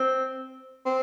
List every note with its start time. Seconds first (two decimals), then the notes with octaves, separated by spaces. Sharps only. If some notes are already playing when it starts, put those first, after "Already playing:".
Already playing: C4
0.86 C4